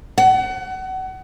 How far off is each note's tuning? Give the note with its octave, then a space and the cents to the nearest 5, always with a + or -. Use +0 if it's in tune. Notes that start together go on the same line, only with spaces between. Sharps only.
F#5 +30